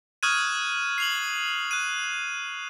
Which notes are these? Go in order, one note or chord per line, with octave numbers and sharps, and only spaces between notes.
C#6 D#6 F6 F#6 G#6 D#7
C7 F7 F#7
F#6 D#7